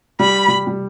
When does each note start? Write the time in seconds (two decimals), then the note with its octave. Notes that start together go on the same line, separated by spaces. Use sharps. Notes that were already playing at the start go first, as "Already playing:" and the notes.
0.20 G3 B5
0.48 G3
0.67 G3